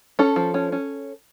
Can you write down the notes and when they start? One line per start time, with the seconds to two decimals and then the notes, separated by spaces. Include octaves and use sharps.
0.19 C#4 A4
0.36 F3
0.54 C#4
0.72 C#4